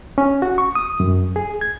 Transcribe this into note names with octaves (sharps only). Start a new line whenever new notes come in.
C#4
F#4
C#6
D#6
F#2
G#4
G#6